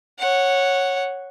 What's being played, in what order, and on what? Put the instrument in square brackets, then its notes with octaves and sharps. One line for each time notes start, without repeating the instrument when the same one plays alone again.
[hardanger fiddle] C#5 F#5